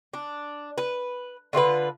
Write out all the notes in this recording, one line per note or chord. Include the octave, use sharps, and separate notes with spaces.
D4
B4
D3 F4 F#4 B4